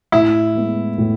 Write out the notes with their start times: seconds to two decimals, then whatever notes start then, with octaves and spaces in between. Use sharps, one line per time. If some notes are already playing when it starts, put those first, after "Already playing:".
0.12 A2 E4
0.55 G#3 B3
0.98 A2